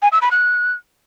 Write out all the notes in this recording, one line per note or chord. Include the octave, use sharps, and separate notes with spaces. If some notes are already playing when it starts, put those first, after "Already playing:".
G#5
E6
B5
F#6